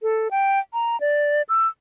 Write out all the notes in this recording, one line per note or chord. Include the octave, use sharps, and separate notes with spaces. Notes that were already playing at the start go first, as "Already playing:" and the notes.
A4
G5
A#5
D5
E6